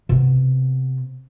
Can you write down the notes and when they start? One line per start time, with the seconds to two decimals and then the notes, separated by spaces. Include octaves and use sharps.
0.09 C3 B3